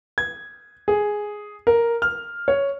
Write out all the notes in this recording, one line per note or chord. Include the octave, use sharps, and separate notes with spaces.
G#6
G#4
A#4
F6
C#5